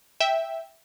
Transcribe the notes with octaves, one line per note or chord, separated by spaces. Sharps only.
E5 G5